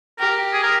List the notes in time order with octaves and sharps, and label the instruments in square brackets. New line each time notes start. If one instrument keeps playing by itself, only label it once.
[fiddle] G4 [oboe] A#4
[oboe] G#4
A#4